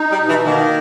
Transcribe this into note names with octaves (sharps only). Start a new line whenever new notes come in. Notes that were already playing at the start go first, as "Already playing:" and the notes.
Already playing: D#4
G3
B2
E3
D#3 A#3